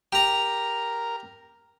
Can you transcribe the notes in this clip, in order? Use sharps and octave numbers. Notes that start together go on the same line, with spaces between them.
G4 A#4 A#5